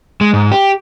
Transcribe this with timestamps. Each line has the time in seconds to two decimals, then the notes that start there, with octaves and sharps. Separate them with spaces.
0.21 G#3
0.33 G#2
0.52 G4